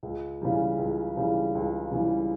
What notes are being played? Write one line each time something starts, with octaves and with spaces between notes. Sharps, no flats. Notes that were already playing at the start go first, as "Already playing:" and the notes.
C#2
C#3 E3 G3
C#2
C#3 E3 G3
C#2
C#3 E3 G3